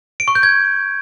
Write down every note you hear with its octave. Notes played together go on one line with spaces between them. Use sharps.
D7
C#6
G6
G#6